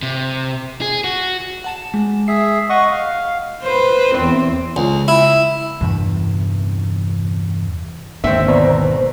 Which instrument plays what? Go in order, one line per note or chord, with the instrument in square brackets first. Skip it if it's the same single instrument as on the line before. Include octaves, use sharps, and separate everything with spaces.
[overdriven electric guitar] C3
G#4
F#4
[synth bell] F#5 A5 E7
G#3
[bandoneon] G#4 E5 [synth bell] C7
[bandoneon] D#5 F#5 C#6
F5
[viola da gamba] B4 C5
E2 C4
[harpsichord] C#2
E4
[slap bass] E2 G2 C3 E3
[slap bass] G#1 D#2 D3 [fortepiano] C4 E5
[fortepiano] B2 [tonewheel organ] C5 D5 A#5
[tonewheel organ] C5